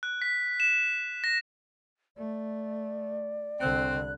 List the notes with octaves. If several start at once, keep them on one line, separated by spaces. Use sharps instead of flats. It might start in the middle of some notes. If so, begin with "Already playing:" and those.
F#6
B6
E7
A#6
A3 D5
C2 D3 C4 F#6